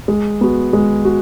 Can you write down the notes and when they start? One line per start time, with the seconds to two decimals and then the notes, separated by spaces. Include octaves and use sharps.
0.08 G#3
0.41 B3 F#4
0.73 G#3
1.05 F#4